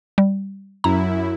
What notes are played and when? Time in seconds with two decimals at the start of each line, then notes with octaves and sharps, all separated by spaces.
0.18 G3
0.84 F#2 E4 A#5